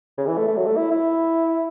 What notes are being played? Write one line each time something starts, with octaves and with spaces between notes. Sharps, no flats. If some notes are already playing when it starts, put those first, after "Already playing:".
C#3
E3
A3
A3
F#3
A3
E4
E4